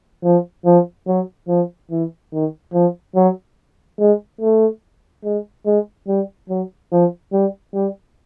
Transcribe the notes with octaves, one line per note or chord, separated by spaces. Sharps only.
F3
F3
F#3
F3
E3
D#3
F3
F#3
G#3
A3
G#3
G#3
G3
F#3
F3
G3
G3